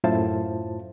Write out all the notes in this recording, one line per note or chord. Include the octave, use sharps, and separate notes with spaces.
F#2 A2 E4 F4 C5 A5